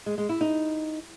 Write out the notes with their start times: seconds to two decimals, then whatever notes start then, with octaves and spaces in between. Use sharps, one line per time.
0.06 G#3
0.18 G#3
0.29 E4
0.41 D#4